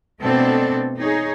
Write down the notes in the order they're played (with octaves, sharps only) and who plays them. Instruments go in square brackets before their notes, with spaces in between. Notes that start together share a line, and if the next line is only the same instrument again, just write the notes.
[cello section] B2 A3 C4 D4 A4
D#4 G#4 C#5